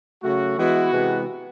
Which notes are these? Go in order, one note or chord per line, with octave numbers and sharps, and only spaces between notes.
C#3 F#3 A3 F#4
E3 G#3 B3 E4 F#4
C3 E3 G#3 B3